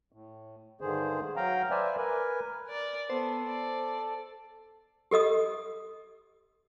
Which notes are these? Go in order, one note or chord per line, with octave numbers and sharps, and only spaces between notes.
A2
G2 D3 D#3 G#4 C5
F#3 F5 G5 A#5
B4 C5 D5 E5 G#5
A#4 B4 G#5
A#4 D5
B3 A4 C5
D5
G4 A4 D#5 D#6